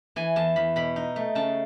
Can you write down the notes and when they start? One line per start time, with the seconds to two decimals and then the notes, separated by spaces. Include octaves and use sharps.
0.16 E3 G#5
0.36 E2 A5
0.56 E2 B5
0.76 B2 B5
0.96 D#4
1.16 A3
1.35 C#3 A5